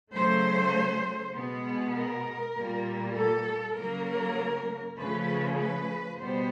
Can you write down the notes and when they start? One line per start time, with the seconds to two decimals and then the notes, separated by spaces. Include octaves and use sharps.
0.14 C#3 F#3 A3 C5
1.35 B2 G#3 B3
1.95 A#4
2.56 A#2 G3 A#3
3.16 A4
3.76 C#3 F#3 A#3 A#4
4.97 C#3 F3 A3 B4
5.58 B4
6.18 B2 G3 B3 C5